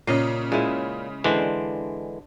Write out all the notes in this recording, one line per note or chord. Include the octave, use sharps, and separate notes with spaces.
A#2 C#3 C#4 D#5 C7
A#2 G#3 E4
D3 E3 G#3 D4 C5 D5